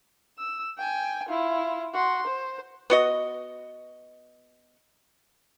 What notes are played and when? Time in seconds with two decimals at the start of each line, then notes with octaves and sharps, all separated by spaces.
0.38 E6
0.77 G5 G#5
1.28 E4 F4
1.93 F#4 C6
2.27 C5
2.90 B3 F#4 D#5